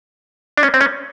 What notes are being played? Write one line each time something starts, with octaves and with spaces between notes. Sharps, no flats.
D4
C#4
C4
C#4